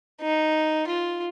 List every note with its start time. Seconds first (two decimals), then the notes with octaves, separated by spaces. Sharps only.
0.22 D#4
0.88 F4